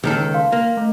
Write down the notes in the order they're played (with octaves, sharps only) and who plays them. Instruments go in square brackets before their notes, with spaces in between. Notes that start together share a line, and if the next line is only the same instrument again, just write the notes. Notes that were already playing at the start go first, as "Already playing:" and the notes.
[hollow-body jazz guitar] C#2 D#3 A4
[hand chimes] F5 C6
[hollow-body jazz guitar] A#3
[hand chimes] A3